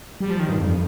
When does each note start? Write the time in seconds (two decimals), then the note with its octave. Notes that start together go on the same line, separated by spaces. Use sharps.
0.20 G3
0.30 F3
0.40 D#3
0.49 G2
0.59 F2